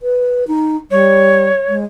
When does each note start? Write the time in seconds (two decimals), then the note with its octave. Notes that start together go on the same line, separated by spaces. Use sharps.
0.02 B4
0.48 D#4
0.91 G3 C#5
1.69 G#3